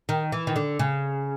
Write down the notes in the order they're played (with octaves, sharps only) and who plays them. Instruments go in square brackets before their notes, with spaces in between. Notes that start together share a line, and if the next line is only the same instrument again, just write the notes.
[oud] D#3
E3
D#3
D3
C#3